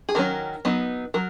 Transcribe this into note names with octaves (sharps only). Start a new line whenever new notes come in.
G#4
D#3 F#3 C#4 A#4
F#3 B3 D#4
F#3 A#4